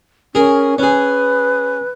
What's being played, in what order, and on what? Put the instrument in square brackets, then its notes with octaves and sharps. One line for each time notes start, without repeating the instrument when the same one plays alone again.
[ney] C#4 [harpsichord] G#4 A#4
[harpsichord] C#4 G#4 [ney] B4